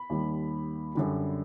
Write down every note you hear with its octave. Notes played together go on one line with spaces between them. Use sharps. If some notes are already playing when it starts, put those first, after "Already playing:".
Already playing: B5
D#2 D#3 G3
F#2 D3 G3